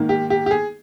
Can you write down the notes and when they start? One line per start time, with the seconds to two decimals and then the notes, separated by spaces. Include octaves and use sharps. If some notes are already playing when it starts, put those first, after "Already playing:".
Already playing: G#2 D#3 A#3
0.09 G4
0.30 G4
0.46 G4
0.51 G#4